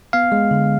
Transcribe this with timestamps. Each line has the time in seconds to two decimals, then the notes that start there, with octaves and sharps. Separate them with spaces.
0.13 B3 F5
0.32 G#3
0.51 D3